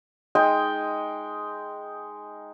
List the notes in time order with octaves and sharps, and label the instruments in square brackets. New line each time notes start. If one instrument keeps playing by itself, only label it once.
[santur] G#3 D#4 G5